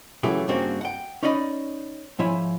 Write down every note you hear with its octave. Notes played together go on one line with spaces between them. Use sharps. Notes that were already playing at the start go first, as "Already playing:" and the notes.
C#3 E3 F#3 A3 E4 G4
G2 C#3 A#3 C4 D4 F#4
F#5 G5
C#4 D#4 E4 D5 D#5 B5
G#2 F3 E4 C#5 G#5